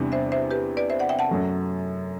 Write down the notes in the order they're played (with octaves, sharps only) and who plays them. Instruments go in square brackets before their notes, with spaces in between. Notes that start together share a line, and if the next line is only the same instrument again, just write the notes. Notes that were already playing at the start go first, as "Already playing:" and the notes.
Already playing: [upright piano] E2 C3 G3 B3 D4
[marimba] C5 E5
C5 E5
G4 B4
B4 D5
C5 E5
D5 F#5
E5 G5
F#5 A5
[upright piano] F#2 F#3 A3